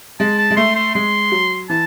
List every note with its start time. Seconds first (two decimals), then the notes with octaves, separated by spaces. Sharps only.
0.20 G#3 A5
0.38 A5
0.51 G#3
0.57 A3 C6
0.76 C6
0.95 G#3 C6
1.32 F#3
1.70 E3 A5